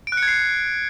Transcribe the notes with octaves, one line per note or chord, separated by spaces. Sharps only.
D7
F#6
C#7
G#6
C7